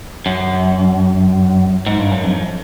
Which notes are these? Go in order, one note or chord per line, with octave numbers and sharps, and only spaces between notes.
F#2
G#2
G2
F#2
F2